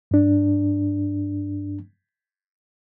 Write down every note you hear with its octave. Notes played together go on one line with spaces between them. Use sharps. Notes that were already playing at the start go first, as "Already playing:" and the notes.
G2 D4